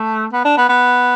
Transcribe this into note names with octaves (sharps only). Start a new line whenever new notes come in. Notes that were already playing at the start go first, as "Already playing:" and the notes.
Already playing: A3
B3
D4
B3
B3